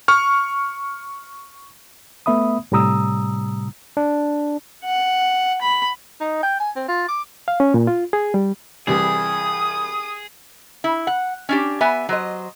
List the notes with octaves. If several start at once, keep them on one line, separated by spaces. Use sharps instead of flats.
C#6 F6
A3 B3 E5 B5 D#6
A2 C3 G3 A#5 D#6 E6
D4
F#5
B5
D#4
G5
G#5
C4
F4
D6
F5
C#4
A#2
F4
G#4
G3
C2 E3 G3 G#4 D#6
E4
F#5
C#4 D4 G4
B3 E5 G#5
F#3 C5 D#5